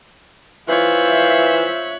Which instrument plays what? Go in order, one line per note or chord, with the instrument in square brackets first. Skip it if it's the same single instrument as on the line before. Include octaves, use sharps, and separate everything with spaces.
[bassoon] E3 [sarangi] F4 [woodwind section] C5 E5 [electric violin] C#5 F#6